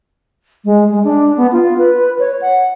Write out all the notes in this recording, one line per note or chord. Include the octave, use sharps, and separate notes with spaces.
G#3
G#3
D4
B3
F4
B4
C#5
F#5